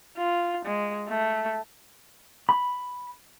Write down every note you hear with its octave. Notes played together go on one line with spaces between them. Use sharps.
F4
G#3
A3
B5